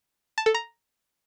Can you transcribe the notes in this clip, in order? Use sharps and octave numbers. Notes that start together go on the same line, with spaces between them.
A5
A4
A#5